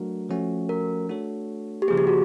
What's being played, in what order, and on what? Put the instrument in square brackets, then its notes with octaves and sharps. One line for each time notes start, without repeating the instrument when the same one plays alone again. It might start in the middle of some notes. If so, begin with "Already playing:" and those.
Already playing: [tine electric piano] F#3 A3 D4 F#4 A#4
F3 A3 C#4 F#4
[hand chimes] A#4
[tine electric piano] A3 D4 F#4 A4 C#5
[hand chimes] G4
[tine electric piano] C#3 F3 A#3 [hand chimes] G#4
[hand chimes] G4
F#4